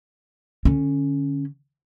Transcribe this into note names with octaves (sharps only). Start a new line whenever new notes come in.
D3 C#4